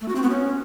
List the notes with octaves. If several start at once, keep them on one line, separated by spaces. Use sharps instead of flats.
A3
F#4
C4
B3
C#4